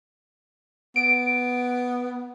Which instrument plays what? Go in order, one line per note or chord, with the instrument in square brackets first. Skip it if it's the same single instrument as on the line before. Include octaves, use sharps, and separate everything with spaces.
[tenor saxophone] B3 [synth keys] D7